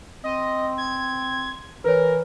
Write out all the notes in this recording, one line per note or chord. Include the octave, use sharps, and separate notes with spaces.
C4 D#5
G#6
E3 A#4 B4 C#5